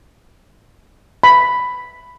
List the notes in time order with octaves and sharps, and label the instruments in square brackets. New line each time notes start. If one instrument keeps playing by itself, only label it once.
[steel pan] B5